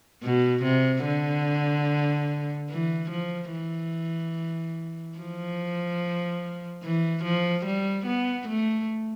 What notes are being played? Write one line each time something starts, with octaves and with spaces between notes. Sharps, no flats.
B2
C3
D3
E3
F3
E3
F3
E3
F3
G3
B3
A3